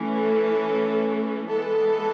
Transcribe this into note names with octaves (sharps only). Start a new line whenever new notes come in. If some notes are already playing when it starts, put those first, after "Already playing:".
Already playing: E3 A3 C#4
A4
E3 G#3 B3 A4